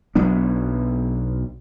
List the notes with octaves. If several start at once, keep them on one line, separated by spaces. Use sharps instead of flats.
B1 F#3 B3 D4